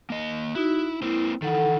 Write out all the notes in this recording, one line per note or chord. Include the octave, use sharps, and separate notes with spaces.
A#3 D#5
D#4 E4 F#4
A#3 C4 E4
D#3 E3 A4 F#5